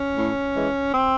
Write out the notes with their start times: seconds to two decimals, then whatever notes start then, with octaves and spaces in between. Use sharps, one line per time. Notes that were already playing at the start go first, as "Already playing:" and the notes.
Already playing: C#4
0.16 A2
0.55 E3 G#3
0.94 C4